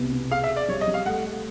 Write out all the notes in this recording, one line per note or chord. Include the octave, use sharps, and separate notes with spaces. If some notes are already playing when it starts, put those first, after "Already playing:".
Already playing: C2 B2 B3
B3
G#4 F5
E5
G#4
D5
G3 C#5
D#5
G3
F5
A3 F#5
A3